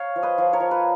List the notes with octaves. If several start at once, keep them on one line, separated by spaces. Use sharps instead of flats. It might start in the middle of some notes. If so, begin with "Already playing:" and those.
Already playing: C#5 F5
F3
B4 D#5
F3
A#4 C#5
F3
B4